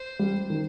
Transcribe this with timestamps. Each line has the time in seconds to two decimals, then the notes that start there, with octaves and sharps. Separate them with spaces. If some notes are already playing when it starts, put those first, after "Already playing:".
Already playing: C5
0.19 G3
0.50 D#3